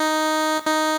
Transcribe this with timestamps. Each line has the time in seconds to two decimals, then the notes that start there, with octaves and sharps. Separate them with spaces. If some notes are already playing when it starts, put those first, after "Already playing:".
Already playing: D#4
0.67 D#4